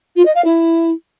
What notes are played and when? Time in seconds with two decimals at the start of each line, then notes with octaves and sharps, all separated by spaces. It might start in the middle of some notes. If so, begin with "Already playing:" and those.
0.16 F4
0.25 D#5
0.35 F5
0.44 E4